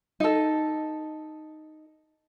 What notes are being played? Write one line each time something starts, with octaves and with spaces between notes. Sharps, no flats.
D#4 A4